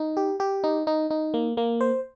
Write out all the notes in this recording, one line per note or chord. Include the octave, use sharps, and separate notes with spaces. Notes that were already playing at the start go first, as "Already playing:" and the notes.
Already playing: D#4
G4
G4
D#4
D#4
D#4
A#3
A#3
C5